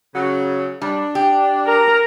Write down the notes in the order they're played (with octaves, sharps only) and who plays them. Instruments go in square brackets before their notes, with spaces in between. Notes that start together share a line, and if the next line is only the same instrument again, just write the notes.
[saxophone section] C#3 F#3
[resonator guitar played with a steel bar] G3 [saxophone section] D4
[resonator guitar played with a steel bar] G4
[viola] A#4 A#5